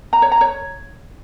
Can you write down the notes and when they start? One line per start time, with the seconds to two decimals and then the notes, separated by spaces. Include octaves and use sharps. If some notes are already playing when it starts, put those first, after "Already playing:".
0.13 A#5
0.22 C#5
0.32 A#5
0.41 C#5